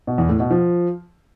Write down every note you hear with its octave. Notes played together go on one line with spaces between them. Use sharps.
B2
E2
A2
B2
F3